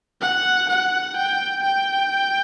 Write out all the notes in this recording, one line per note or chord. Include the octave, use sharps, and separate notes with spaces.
F#5
F#5
G5
G5